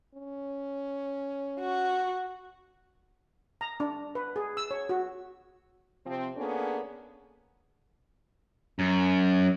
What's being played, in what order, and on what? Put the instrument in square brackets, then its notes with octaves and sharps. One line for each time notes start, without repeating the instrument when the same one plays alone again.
[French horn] C#4
[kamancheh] F#4 C#6
[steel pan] A#5
D4
B4
G#4
E6
C#5
F#4
[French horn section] C3 F3 C4
A#3 B3 C#4 D4 G#4 A4
[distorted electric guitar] F#2